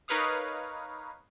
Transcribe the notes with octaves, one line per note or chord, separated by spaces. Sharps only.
D#4 A#4 B4 C#5 F5 D#6